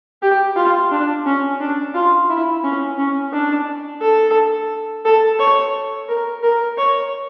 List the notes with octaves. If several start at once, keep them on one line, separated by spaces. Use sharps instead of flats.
G4
F4
D4
C#4
D4
F4
E4
C#4
C#4
D4
A4
A4
C#5
A#4
A#4
C#5